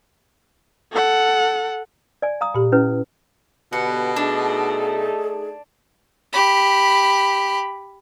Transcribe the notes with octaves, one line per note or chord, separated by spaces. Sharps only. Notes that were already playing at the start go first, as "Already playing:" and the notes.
A4 F#5
D5 G#5
F5 A#5 D#6
A#2 G4
C#4 E4 B4
B2 D3 B3 G4 F#5
A3 D4 D#4 G#4 A4
G4 B5